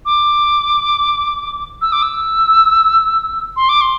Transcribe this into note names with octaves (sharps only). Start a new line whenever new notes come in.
D6
E6
D6
E6
C6
D6
C6